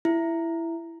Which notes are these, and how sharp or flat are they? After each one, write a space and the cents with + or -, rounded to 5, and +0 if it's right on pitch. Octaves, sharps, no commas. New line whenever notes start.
E4 +10